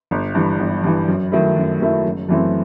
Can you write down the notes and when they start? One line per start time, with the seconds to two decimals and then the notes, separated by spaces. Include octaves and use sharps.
0.11 G1
0.35 G2 E3
0.60 G1
0.84 G2 E3
1.08 F#2
1.32 D#3 F#3 A3 E4
1.56 F#2
1.80 D#3 F#3 A3 E4
2.05 F#1
2.29 F#2 E3 A3 C4